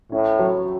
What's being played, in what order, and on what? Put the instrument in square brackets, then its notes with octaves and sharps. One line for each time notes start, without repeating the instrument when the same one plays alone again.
[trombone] A2 [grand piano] C#4
[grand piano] F#3